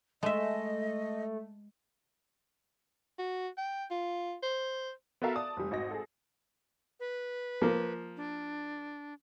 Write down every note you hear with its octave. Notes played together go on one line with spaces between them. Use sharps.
G#3 A3 D#5 E5
F#4
G5
F4
C5
B3 F#4 A4 A#4 E5 F5
D5 A5 D#6
F1 G3
G#1 F#4 D#5 A#6
G#4 A4
B4
F3 A#3
D4